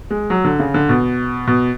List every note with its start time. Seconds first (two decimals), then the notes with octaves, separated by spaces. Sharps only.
0.10 G#3
0.30 F#3
0.44 D3
0.59 C#3
0.74 D3
0.89 B2
1.47 B2